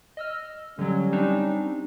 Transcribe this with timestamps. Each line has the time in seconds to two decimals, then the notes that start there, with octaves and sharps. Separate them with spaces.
0.17 D#5 E6 F6
0.79 D3 F#3 G3 C#4
1.13 C4 D4 D#4